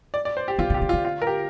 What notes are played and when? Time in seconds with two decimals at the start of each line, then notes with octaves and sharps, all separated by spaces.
0.14 D5
0.25 D5
0.37 C5
0.48 G4
0.59 D3 F4
0.70 D3
0.74 C3 G4
0.82 D3
0.89 F4
0.93 D3
1.05 F4
1.22 A#4
1.27 G4